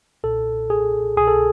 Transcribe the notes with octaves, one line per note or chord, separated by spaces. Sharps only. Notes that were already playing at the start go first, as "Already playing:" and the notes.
B1 A#2 A4
G#4
C2 B2 G#4
A4